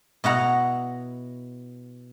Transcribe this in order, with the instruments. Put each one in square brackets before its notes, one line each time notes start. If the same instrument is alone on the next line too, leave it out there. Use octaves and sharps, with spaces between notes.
[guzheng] B2 E4 F#5 A#5